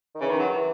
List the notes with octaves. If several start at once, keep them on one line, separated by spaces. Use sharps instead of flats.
D#3
C#3 E3
D#3
F#3
E3